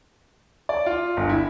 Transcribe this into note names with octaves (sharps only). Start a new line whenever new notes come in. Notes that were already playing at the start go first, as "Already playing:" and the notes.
D5
F4
G1
E4